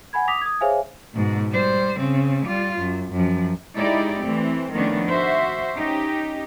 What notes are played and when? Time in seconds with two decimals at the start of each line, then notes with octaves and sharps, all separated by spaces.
0.13 F#5 G#5 B5 G#6
0.28 D6 D#6 A#6 B6 F7
0.41 D#6 G#6
0.61 G#4 C5 C#5 E5 F5 G#5
1.14 G#2 B2
1.51 G3 C5
1.99 C#3 C4
2.46 G3 F4
2.80 F#2
3.13 F#2 F3
3.77 G#3 D#4 E4 G4 D5
4.23 E3 A3 C4
4.72 D#3 F3 A3 B3 C#4 D4
5.09 F#4 C5 E5
5.76 C#4 D#4 G4